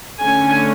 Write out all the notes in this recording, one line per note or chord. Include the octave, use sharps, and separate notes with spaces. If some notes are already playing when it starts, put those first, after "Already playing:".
D3 A3 C#4 G#5